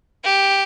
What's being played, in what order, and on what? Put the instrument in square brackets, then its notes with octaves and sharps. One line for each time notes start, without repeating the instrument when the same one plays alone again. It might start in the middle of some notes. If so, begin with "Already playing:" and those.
[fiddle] G4